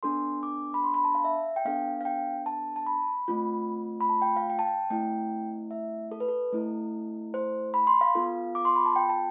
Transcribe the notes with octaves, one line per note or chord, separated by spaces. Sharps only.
B3 D4 A4 C6
D6
B5
C6
B5
A5
F5
E5
G5
B3 D4 A4 F5
F5
G5
A5
A5
B5
A3 C4 F4
B5
A5
G5
F5
G5
A5
G5
A3 C4 E4 G5
E5
A4
B4
A4
A3 C4 E4 A4
C5
B5
C6
F5
B3 F4 A4
D6
C6
B5
A5
G5
A5